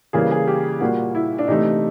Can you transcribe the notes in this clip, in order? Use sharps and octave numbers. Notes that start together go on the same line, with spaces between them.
C#3 E3 G3 A#3 G#4
G#4
G4
A#2 G3 A#3 F#4
E4
D4
C3 E3 A3 D#4